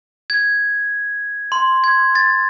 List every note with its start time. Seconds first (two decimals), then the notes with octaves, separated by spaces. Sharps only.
0.30 G#6
1.52 C6
1.84 G#6
2.15 A6